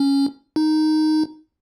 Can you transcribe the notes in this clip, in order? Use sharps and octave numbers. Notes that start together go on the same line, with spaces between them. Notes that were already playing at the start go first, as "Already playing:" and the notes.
Already playing: C#4
D#4